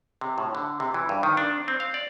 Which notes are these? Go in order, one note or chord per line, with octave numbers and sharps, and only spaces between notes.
C3
A2
D3
C3
E3
G2
D#3
D4
C4
F5
D5